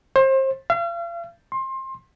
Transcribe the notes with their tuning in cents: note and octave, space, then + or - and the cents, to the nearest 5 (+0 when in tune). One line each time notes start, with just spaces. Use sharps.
C5 +30
F5 -40
C6 +25